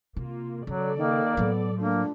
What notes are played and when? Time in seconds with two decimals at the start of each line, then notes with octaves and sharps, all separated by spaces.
0.16 C3 A#3 F4
0.67 C#3 F#3 A4 D5
0.97 D#3 A#3
1.37 A2 F#3 B3
1.79 F3 A3 A#3 D4